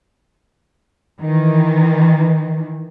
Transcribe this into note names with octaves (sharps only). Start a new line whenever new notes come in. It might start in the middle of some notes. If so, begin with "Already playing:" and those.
D#3 E3